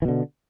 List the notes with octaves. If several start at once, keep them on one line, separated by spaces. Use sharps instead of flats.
B2 D3 E3